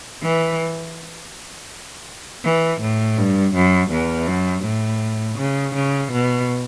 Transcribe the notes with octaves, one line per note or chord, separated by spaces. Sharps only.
E3
E3
A2
G2
F#2
E2
F#2
A2
C#3
C#3
B2